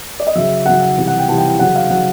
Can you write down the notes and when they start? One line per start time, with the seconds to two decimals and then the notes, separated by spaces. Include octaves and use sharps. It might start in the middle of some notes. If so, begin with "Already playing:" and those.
0.20 D5
0.27 D#5
0.35 C#3 F#3 E5
0.66 C#3 F#3 F#5
0.82 F#5
0.97 C3 E3 G3
1.07 F#5
1.19 G5
1.28 C3 E3 G3 A5
1.38 G5
1.49 G5
1.59 C#3 F#3 F#5
1.76 F5
1.90 C#3 F#3 F#5